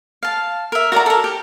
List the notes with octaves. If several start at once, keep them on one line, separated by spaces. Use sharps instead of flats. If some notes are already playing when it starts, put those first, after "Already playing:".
F5 A5
A#4 E5
F#4 A#4 D5 A#5
A4 A#4
G4